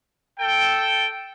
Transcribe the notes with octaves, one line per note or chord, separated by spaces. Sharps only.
A4 G5